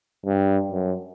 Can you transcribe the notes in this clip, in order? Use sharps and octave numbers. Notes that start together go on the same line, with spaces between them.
G2
F#2